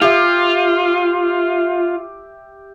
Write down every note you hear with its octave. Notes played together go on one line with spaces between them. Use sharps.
F4 G4 E5